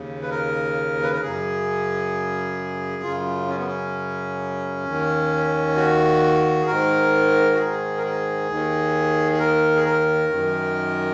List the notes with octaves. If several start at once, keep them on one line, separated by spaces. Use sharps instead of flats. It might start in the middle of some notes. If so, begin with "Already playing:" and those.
Already playing: D#2 C#3
B4
A#4
B4
A#4
F#2 C#3 G#4
F#2 C#3 F4
C#4
B3
C#4
D#2 D#3
F#4
G#4
G#2 D#3 A#4
F#4
G#4
A#4
G#4
D#2 D#3
G#4
A#4
G#4
A#4
F#2 D#3